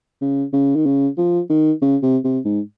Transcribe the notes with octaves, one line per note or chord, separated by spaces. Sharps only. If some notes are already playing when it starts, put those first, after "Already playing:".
C#3
C#3
D#3
C#3
F3
D#3
C#3
C3
C3
G#2